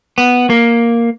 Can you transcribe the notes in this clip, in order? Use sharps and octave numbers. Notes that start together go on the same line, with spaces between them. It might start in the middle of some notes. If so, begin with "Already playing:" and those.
B3
A#3